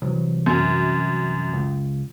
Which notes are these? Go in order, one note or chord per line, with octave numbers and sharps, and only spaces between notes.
C2 E3 F#3
F#2
C#2